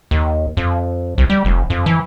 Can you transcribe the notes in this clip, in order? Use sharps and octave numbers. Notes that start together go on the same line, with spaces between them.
D#2
F2
C2
G3
F1
F2
E3